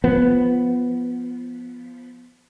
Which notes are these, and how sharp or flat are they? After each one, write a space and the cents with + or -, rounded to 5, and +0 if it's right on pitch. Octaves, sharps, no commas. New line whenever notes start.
F3 +0 B3 +0